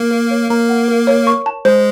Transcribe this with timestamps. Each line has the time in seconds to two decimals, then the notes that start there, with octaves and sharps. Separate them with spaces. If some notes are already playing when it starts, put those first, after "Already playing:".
Already playing: A#3
0.11 A#4
0.31 C#5
0.50 A#3 A#5
0.69 F#5
0.88 A#4
1.07 C#5
1.27 C#6
1.46 A5
1.65 G#3 C5